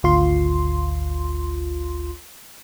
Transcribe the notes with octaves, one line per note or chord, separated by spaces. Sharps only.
G#1 D2 F4 C6